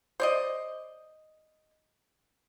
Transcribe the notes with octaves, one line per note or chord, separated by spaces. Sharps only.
C5 D5 D#5